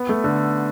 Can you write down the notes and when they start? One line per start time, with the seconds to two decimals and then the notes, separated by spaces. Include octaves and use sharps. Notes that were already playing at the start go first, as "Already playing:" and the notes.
Already playing: B3
0.09 A3
0.24 D3